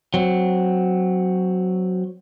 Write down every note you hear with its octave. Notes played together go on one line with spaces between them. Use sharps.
F#3 C4